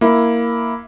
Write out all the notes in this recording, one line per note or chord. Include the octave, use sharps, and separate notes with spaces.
A#3 E4